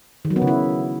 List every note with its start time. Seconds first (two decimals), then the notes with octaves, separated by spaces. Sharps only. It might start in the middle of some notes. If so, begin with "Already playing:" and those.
0.25 D#3
0.30 F#3
0.36 B3
0.42 C#3
0.47 E4